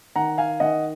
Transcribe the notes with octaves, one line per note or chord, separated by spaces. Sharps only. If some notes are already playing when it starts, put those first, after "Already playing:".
D#3 F#5 A#5
F5 G#5
D#3 D#5 F#5